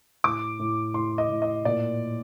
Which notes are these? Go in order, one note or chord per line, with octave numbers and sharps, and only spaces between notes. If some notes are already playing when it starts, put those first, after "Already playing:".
A2 D6
A2
A2 C6
D#5
A2
D#5
A#2 D5